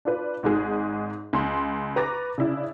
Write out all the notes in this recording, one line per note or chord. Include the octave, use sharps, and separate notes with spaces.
D4 F4 B4
G#1 G#2 G#3 G#4
C#2 C6
B4 A#5 C#6 D6 A6 A#6
C#3 D4 E4